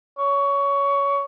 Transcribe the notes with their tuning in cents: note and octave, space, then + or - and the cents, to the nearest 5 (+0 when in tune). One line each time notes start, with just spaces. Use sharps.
C#5 +20